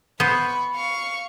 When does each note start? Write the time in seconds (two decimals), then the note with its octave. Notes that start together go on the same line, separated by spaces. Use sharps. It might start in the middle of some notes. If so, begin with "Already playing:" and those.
0.20 B3 C5 B5 C#6
0.74 F5 C#6